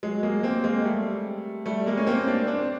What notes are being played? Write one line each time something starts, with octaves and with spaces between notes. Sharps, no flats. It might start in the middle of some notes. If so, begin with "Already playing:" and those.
F#3 G#3
G#3 A#3
A#3 C4
G#3 A#3
G3 A3
G3 A3
G#3 A#3
C#4
A#3 C4
C4 D4
C4 D4